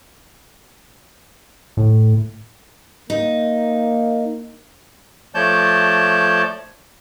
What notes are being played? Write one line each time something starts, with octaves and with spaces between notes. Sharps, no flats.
A2
A#3 D#4
F3 A3 C#5 D5 A5 G6